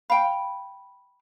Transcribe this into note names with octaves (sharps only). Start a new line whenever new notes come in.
F5 G5 B5